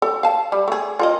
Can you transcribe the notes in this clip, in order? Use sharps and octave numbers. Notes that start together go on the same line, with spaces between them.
A4
F5 A5
G3
A3 G#4
F4 A#4 D#5